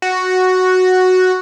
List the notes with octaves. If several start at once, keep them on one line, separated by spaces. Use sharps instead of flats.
F#4